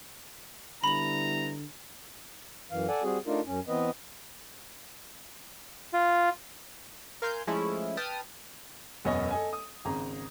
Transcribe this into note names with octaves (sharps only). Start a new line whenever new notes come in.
D3 G3 B3 E4 A#5 B5 F#7
F#2 E3 F5
A4 D5 F#5 G#5
G3 C4 F#4 G#4
A3 D4 D#4 F4 A#4
F#2 C#4
E3 B3 C4 B4 D#5
F4
A#4 F5 G#5 C6 G6
F3 G#3 A3 C#4 E4
B4 G5 A5 D#6 F6
E1 F#2 B3 C#5 D#5
A4 D#5 G#5
D#6
G#1 C#3 A#5